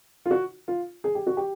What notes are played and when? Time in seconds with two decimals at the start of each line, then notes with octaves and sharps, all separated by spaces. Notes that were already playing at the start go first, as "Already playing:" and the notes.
0.26 F4
0.31 F#4
0.68 F4
1.04 G#4
1.15 G4
1.27 F#4
1.37 G4